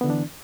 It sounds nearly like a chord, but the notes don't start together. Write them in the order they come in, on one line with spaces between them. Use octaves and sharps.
B3 D3 E3 D4